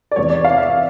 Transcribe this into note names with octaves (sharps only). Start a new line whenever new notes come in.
D5
E2 C3 D#3 C#5
D5
F5
E5